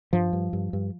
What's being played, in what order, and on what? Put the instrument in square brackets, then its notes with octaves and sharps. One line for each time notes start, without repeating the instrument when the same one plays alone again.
[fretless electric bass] G2 F3
G2
G2
G2